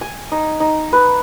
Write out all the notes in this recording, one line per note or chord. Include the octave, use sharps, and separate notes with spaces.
G#5
D#4
D#4
B4